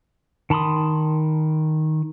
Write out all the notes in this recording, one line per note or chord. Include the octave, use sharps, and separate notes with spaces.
D#3 A5 B5 C6 D#6